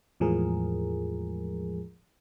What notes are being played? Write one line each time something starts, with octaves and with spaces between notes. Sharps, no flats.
E2 A2 F3 G#3 G#4 A#4